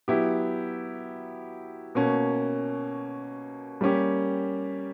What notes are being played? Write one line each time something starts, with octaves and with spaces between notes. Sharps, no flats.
F#3 B3 E4 G4
B2 A#3 C#4
G3 A#3 C#4 G4